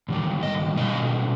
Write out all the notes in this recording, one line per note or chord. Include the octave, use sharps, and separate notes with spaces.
G#2 D#3 G3
D#5
B2 G3 C#4 D#5